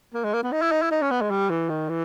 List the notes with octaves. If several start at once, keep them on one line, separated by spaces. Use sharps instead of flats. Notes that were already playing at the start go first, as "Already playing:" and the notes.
A#3
G#3
A#3
B3
D#4
E4
D#4
E4
D#4
C#4
B3
G#3
G3
E3
D#3
E3